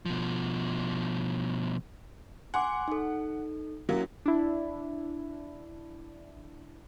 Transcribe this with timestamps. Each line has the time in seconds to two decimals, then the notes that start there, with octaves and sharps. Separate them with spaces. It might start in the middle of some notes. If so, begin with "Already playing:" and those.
0.06 B2 F3
2.54 F#5 G#5 C6 D6
2.88 D#4 A4
3.89 F#3 A#3 C#4 E4 F#4
4.26 D4 E4